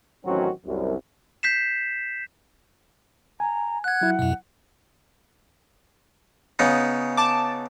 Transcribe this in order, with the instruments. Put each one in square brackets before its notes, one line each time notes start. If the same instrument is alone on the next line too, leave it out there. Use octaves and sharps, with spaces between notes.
[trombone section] A1 D#3 F#3 C4 C#4 F#4
C2 F#2
[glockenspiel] G6 B6 C7 E7
[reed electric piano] G#5 [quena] A#5
[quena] F#5 [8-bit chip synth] F#6 G#6
[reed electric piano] F#3 E4
[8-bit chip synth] F2 B2
[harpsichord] C#3 B3 D#4
[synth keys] A5 D6